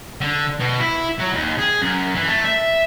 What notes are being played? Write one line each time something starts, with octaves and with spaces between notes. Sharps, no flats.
D3
B2
E4
F#3
D#2
G#4
F#2
E3
A3
E5